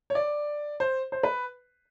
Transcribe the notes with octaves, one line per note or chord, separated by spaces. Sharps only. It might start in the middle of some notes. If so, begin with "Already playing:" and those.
C#5
D5
C5
C5
B4